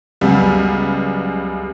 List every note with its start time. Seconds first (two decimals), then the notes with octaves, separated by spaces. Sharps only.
0.21 C#2 F#2 G3 B3